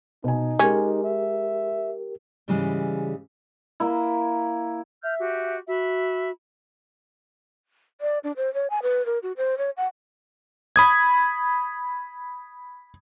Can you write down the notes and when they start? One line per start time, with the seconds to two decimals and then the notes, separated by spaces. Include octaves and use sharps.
0.24 B2 D#4 G#5
0.59 G#3 C#4 G4 A#4
1.04 E5
2.48 G#2 C#3 E3 G3 G#3
3.80 A#3 E4
5.04 E5 F6 G6
5.19 F#4 G4
5.68 F#4 E5 B5
8.01 D5
8.24 D4
8.37 C5
8.54 C#5
8.70 G#5
8.83 B4
9.06 A#4
9.23 F#4
9.37 C5
9.58 C#5
9.77 F#5
10.76 B5 D#6 G#6